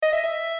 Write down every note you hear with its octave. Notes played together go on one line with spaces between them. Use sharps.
D#5
E5
E5